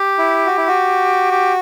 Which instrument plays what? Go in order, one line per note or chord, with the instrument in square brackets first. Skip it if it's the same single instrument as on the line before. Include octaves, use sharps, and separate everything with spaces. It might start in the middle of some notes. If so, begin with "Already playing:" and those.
Already playing: [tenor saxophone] G4
[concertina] E4
F#4
E4
F#4
[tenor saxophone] G4